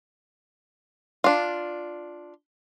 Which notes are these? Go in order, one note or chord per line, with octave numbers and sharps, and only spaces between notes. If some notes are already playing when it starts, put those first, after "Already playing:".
D4 F4